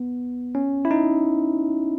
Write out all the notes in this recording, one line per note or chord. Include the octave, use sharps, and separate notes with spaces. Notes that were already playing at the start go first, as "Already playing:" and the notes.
Already playing: B3
C#4
E4
D#4